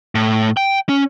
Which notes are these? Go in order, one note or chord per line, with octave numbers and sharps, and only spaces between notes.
A2
G5
C#4